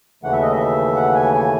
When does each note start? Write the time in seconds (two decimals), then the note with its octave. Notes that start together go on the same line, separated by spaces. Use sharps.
0.23 D#2 C#3 E3 A3 F#5
0.33 E5
0.42 D#5
0.53 E5
0.96 F#5
1.15 G#5
1.34 G#5